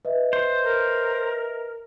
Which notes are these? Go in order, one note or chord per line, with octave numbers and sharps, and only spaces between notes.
B4 D#5 E5
C5
A#4